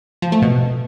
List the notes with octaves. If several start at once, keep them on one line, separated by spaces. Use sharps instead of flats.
F3
A3
B2